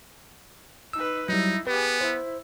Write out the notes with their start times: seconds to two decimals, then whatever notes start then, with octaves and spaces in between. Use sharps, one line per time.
0.93 D#4 B4 E6
1.29 F#3 G3 D#4 E4
1.67 B3 G4 G#4 B4
2.01 E4 C5